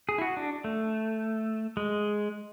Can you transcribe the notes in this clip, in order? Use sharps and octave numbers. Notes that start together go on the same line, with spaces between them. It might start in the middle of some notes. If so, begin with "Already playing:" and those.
G#4
E4
F#4
D4
A3
G#3